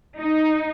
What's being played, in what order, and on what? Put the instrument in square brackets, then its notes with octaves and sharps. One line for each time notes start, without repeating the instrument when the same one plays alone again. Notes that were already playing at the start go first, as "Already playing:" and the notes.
[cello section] D#4